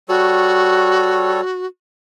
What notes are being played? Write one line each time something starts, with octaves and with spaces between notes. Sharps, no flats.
G3 F#4 A4 C#5